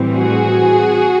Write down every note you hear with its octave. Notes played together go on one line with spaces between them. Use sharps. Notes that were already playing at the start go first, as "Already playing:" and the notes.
Already playing: A2 E3 G3 C4
F#4 G#4